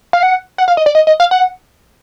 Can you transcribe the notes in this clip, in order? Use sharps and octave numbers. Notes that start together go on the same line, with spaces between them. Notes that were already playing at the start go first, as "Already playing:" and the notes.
F5
F#5
F#5
F5
D#5
D5
D#5
D#5
F5
F#5